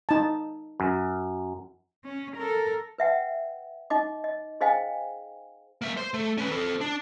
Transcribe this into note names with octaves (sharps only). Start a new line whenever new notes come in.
D#4 A5
F#2
C#4
A4 A#4
B4 E5 F#5 G5
D#4 D#5 D6
D#5
G#4 C5 D#5 F5 G5 G#5
A#3 E5
C5 C6
A3
C#4 B4
C4 A4
D4